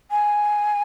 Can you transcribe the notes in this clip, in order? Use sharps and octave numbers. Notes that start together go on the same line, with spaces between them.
G#5